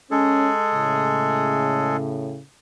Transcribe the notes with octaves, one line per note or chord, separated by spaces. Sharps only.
G#3 C#4 G#4 A4
A2 C#3